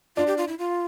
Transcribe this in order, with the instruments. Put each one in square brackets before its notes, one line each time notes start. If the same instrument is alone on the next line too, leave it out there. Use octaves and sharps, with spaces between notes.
[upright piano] D4 [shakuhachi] F4
[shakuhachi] G4
F4
E4
F4